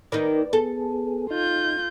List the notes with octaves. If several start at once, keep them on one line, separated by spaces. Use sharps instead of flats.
D#3 A#3 D#4 B4 D5
B3 G#4 A4
D#4 F4 G6